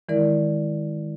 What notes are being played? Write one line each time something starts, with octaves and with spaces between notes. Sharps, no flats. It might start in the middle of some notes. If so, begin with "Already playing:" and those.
D#3 E3 G#3 E4 A#4 D5